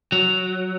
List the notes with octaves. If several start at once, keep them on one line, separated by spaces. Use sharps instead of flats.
F#3